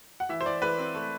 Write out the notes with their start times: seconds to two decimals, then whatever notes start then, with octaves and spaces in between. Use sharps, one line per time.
0.20 F#5
0.29 E3 E5
0.41 C5
0.45 E3 D5
0.62 E3 B4
0.78 C4
0.94 A3